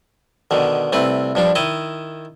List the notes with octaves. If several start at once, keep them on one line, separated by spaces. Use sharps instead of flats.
B2 D3 D#3
C2 A3 C4 B4
G2 F3 D4
D#3 E4 D#5 A5